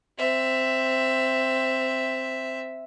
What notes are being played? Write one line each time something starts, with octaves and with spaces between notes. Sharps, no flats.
C4 E5